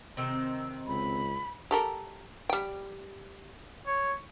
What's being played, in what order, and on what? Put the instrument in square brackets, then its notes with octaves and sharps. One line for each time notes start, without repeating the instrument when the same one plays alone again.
[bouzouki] C3 D#3 C4
[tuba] C#2 [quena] B5
[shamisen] G4 A4 A#4
G3 G5
[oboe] C#5